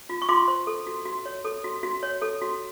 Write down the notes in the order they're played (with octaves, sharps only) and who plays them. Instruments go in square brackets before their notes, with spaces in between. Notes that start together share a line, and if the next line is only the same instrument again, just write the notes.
[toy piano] F4
C#6
F4 C6 D6
C5
A4
F#4
F#4
C#5
A4
F#4
F#4
C#5
A4
F#4